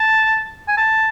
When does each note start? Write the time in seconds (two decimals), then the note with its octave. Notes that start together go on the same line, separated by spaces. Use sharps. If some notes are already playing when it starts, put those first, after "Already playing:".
Already playing: A5
0.68 G#5
0.77 A5